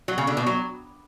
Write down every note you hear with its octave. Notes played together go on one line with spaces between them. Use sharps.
F#3
C#3
D3
B2
F#3